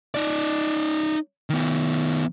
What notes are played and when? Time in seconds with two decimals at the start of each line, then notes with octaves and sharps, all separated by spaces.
0.15 D#4 D5
1.50 D#3 B3